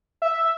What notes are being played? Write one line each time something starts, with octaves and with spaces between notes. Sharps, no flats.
E5